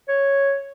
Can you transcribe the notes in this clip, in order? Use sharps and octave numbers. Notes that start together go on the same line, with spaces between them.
C#5